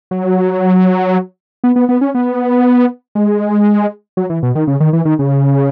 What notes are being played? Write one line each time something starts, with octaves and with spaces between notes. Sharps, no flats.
F#3
B3
B3
B3
C#4
B3
G#3
F#3
E3
B2
D#3
C#3
D#3
E3
D#3
C#3